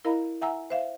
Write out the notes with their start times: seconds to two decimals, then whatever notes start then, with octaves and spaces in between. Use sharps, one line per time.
0.05 E4 A#4 D#5 F5 A#5 B5
0.41 E5 F#5 G#5 A#5 E6
0.70 C5 E5 F5